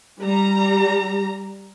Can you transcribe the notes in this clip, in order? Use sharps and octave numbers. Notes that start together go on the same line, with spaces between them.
G3 A#5